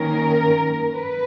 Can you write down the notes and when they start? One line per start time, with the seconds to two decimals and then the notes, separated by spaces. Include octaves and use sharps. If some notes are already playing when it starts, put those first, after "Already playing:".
Already playing: D#3 A#3 C#4 A#4
0.93 B4